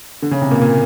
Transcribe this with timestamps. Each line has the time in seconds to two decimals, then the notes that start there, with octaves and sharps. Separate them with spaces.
0.22 D3
0.31 C#3
0.42 C3
0.51 A#2
0.61 A#2